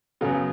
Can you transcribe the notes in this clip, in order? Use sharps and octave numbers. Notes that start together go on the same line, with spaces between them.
F#2 C#3 F#3 B3